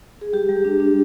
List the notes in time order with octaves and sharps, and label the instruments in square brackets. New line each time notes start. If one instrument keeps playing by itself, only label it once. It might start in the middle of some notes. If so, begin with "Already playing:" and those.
[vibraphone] G#4
G3 G4
G3
D4
D4